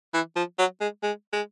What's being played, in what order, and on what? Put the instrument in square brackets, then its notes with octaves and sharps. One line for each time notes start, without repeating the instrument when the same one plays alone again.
[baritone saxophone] E3
F3
F#3
G#3
G#3
G#3